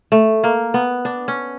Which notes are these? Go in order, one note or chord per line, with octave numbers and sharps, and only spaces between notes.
A3
A#3
B3
D4
C#4